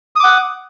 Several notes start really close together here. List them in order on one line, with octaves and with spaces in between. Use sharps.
D#6 D6 F#5